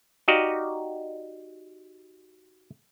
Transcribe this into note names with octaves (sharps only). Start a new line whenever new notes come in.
D#4 F#4 G4 D5 D#5 F5